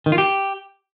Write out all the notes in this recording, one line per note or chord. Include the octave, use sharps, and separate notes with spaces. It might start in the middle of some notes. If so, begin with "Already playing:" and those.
D#3
F4
G4